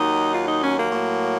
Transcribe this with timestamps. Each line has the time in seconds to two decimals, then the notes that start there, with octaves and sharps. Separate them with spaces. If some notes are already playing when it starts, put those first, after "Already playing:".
Already playing: D#2 D#3 F#3 D#4
0.34 F4
0.48 D#4
0.63 C#4
0.78 A#3
0.92 A2 F#3